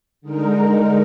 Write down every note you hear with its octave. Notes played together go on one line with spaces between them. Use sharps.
D3 G#3 D#4 A#4